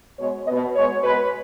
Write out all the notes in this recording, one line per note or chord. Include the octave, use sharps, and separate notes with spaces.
B2 G#3 B3 C#5
B2 B3 D#5
B2 G#3 B3 C#5
B2 G#3 B3 B4